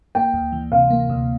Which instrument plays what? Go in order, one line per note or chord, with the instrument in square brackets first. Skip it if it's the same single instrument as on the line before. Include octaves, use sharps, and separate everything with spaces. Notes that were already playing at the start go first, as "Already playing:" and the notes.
[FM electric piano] A#3 [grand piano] G5
[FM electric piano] D2
E3
[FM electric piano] C3 [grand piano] F5
[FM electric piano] A#3
D2